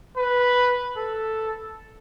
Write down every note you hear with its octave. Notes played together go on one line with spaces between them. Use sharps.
B4
A4